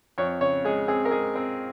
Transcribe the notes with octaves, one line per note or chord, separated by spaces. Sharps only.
F2 C#5
C#3 C#5
G#3 G#4
C4 G#4
A#4
G#3 G#4
C4